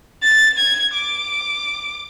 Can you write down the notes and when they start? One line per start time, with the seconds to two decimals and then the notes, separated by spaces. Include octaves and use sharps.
0.23 A6
0.59 G#6
0.95 D6